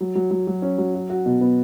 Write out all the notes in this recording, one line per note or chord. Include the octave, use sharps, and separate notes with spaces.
F#3
F#3
F#3
F#3
C#4
F#3
F#4
F#4
B2
B3